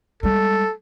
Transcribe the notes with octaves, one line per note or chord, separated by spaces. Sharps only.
G3 G#3 A4